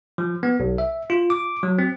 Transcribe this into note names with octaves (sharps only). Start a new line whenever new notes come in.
F3
B3
B1
E5
F4
D6
F#3
C4